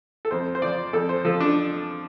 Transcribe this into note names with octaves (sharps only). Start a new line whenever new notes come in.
A4
F2 C5
C5
F3 D5
F2 A4
C5
F3 A4
D4